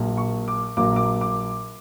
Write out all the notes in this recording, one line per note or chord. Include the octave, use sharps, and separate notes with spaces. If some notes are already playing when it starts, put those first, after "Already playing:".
Already playing: A#1 A#2 F#3 A#3
C#6
D6
A#1 A#2 F#3 A#3 D6
D6
D6